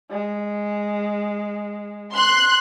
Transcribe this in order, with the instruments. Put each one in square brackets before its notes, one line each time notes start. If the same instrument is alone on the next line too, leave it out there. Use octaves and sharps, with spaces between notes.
[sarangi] G#3
[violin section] C6 F#6